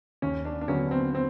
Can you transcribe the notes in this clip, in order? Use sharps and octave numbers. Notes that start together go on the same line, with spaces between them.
D#2 C#4
D4
D4
D3 F#3 B3 C#4
C4
C4